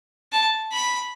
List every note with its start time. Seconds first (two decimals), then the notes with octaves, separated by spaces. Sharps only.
0.32 A5
0.73 B5